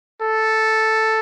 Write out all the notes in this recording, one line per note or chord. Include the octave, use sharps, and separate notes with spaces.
A4